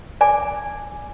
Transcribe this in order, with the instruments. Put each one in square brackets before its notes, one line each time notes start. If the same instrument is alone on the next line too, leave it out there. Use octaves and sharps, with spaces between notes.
[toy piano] D5 G#5 D6